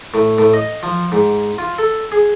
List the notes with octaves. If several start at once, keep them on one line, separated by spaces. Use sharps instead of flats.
A2
A2
D#5
F3
G#2
F4
A4
G#4